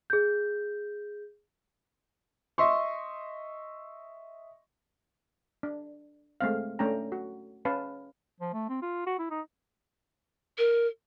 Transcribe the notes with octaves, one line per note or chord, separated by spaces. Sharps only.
G#4 G6
D#5 E5 C6 C#6
D4
G#3 A3 C4 F5
A3 C#4 D4 G5 A#5
F#4
C#4 B4 F5 A5
F3
A3
C4
F4
F#4
E4
D#4
A#4